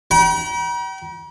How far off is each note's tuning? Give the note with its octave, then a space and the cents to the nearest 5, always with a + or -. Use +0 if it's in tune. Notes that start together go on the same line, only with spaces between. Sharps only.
G5 -40 A#5 +45